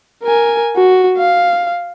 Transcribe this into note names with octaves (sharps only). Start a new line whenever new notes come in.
A#4 G#5
F#4
F5